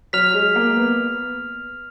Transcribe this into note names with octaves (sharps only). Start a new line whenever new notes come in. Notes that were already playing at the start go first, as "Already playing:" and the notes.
F#3 F6 B6 F7
G#3
A#3
B3